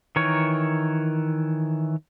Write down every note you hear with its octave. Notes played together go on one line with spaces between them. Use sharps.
D#3 E3 A#4 C#5